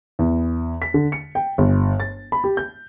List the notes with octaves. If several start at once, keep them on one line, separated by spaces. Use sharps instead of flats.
E2
B6
D3
C#7
G5
G1
A6
B5
G4
G6